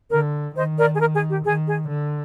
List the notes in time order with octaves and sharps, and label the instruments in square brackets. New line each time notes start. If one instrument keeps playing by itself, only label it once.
[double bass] D3 [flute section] A#4
[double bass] D#3 [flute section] C5 D#5
[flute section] A#4 D5
G#4
A#4
G#4
G4
[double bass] D#3 [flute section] G#4
[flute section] G#4
[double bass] D3